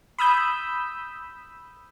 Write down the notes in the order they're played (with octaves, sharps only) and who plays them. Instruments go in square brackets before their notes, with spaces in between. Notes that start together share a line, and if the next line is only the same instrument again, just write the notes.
[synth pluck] B5 D#6 E6 G6